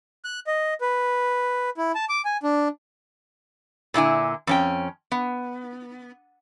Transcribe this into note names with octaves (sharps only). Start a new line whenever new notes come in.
F#6
D#5
B4
E4
A5
D6
G#5
D4
A#2 D3 E4 G#5
F2 C#4 G5
B3